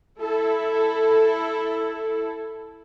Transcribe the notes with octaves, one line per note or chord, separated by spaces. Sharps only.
E4 A4